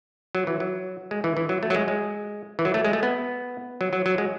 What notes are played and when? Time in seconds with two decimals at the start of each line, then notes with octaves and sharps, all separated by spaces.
0.35 F#3
0.47 E3
0.60 F#3
1.11 G#3
1.24 E3
1.37 E3
1.49 F#3
1.63 A3
1.70 F#3
1.75 G#3
1.88 G#3
2.59 E3
2.65 F#3
2.74 A3
2.85 G#3
2.93 A3
3.03 B3
3.81 F#3
3.93 F#3
4.06 F#3
4.18 G#3